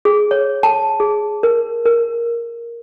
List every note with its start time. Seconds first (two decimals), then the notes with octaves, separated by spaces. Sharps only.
0.05 G#4
0.31 C#5
0.63 A5
1.00 G#4
1.43 A#4
1.85 A#4